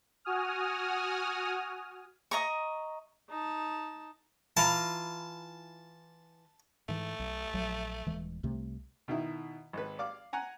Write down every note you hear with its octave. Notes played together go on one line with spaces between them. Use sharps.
F#4 G#5 D#6 F6
D#5 A#5 C#6
D#4 A5
E3 F4 A5 A#5
G#2 E3 A3
B1
A#1 F#3
D#1 E3 G#3
C2 C3 A3
B2 D#3 E4
G#1 B4
D5 F5 D6
F#5 G#5 A#5